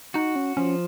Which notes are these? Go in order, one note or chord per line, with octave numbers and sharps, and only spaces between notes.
D#4 F#4
C#4
F3 C#4